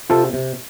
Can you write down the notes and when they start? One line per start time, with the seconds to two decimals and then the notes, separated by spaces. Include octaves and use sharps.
0.10 C3 F4 A4
0.33 C3